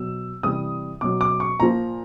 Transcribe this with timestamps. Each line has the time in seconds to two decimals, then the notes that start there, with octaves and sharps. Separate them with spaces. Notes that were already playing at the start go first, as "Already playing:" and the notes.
Already playing: B2 F#3 E6
0.43 C3 E3 G3 D#6
1.01 B2 F#3 D6
1.21 D6
1.40 C#6
1.60 A#2 F3 A#5